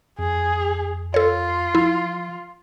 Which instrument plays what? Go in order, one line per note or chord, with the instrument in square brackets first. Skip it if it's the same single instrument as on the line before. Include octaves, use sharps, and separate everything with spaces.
[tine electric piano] F2 [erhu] G#4
[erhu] F4 [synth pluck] A4 C#5
[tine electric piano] F3 [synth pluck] E4